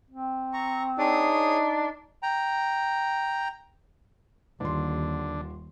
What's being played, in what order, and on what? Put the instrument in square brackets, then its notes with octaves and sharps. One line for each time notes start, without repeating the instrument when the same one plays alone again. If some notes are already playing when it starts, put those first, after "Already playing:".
[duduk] C4
[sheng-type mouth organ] A#5 C#6
[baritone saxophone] D4 [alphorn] D#4 [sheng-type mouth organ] G#4 C#5 D#6
[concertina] G5 A#5
[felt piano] D#1 C6 [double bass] D#2 [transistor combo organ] D3